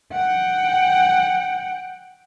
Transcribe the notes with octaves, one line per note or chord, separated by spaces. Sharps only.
F#5 G5